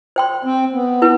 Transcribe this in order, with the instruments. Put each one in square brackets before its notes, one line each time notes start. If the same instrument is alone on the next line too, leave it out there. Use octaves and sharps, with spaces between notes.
[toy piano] C5 G5 C6
[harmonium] C4
B3
[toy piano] E4 B4